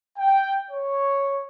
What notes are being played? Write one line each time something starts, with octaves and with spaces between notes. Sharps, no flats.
G5
C#5